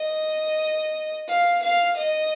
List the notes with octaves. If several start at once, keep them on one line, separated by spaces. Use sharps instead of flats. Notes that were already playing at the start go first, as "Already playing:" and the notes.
Already playing: D#5
F5
F5
D#5